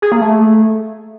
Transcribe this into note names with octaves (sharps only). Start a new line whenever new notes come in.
G#4
A#3
A3